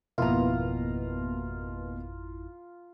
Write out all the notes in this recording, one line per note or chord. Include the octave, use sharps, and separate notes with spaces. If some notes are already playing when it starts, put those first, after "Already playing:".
G#1 F2 B2 A#3 B3 E4 F4 A#5